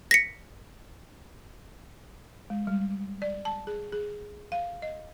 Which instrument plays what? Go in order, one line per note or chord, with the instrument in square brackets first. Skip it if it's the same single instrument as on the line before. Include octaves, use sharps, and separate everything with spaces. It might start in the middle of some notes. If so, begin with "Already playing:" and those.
[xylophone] A#6 B6 C#7
[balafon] G#3
G3
D5
A5
G#4
G#4
F5
D#5